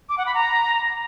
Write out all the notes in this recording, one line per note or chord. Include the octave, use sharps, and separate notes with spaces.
D6
F#5
B5
A#5